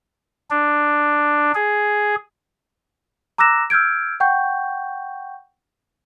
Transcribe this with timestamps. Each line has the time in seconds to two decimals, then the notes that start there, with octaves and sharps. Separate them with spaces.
0.50 D4
1.55 G#4
3.38 A#5 D6 E6 F#6 A#6 E7
3.70 E6 F6 G6 G#6 D7
4.20 F#5 G5 C#6 G6